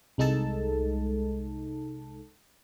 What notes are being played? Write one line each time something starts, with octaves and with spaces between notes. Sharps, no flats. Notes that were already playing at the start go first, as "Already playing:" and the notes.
C2 G#3 D#4 A4 A5